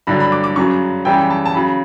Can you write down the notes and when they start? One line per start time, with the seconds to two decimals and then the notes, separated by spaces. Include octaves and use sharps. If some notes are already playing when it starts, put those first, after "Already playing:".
0.07 G2 D3 F#3 B5
0.20 B5
0.32 D6
0.44 D6
0.56 F#2 C#3 F#3 C#6
1.05 F#2 C#3 E3 G3 G5
1.30 A5
1.45 A5
1.54 C#3 F#3 B5